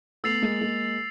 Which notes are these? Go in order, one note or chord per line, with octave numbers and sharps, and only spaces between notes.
A3 B3 E6 A6 C7 F7
G#3 A#3
G#3 A#3